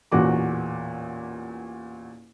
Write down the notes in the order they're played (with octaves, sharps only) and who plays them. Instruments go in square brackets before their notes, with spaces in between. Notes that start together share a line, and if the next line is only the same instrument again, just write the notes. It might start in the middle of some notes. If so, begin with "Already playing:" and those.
[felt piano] A1 E2 A#2 F#4 D6